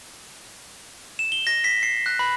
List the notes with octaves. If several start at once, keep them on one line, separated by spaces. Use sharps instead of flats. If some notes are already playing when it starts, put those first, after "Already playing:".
E7
G7
A#6
B6
C7
F#6
B5